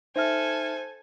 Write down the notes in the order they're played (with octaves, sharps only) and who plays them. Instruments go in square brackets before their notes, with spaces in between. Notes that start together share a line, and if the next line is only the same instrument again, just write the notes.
[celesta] D#4 E5 F6 [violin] A4 G#5 [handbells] C5